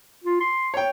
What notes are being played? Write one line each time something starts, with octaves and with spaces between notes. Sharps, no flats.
F4
C6
C#5 G5